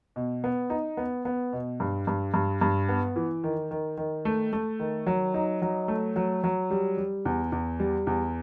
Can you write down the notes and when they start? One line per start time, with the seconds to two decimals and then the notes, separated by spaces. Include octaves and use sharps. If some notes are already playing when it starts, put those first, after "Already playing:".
0.16 B2
0.44 B3
0.70 D#4
0.97 B3
1.25 B3
1.53 B2
1.80 G2
2.07 G2
2.34 G2
2.61 G2
2.89 B3
3.16 E3
3.44 D#3
3.71 D#3
3.98 D#3
4.25 A3
4.53 A3
4.80 D#3
5.06 F#3
5.34 D#4
5.62 F#3
5.88 A3
6.16 F#3
6.44 F#3
6.71 G3
6.97 G3
7.25 E2
7.52 E2
7.80 G3
8.07 E2